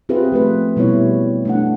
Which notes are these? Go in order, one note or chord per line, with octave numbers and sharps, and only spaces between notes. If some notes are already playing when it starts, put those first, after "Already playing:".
C4 F4 G4 G#4 B4 E5
F3 A3 B4
B2 G3 B3 E4 C#5
A3 D4 F#5